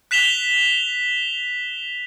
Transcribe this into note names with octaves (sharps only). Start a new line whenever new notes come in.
F#6 B6 E7 F7 G7